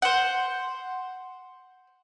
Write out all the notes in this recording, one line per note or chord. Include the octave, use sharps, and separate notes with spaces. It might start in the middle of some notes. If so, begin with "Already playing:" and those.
C5 F#5